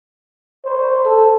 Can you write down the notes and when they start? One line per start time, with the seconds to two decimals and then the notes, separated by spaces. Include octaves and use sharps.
0.65 C5
1.05 A4